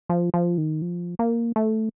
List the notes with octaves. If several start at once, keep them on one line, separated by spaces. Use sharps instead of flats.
F3
F3
D#3
F3
A#3
A3